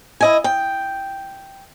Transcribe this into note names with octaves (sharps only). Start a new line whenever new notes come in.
E4 D#5 G#5
G5